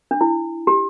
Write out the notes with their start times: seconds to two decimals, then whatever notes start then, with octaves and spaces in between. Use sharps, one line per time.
0.11 D4
0.21 E4
0.67 G4